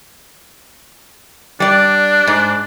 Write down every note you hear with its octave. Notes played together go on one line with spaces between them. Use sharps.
G3 D4 D5
G#2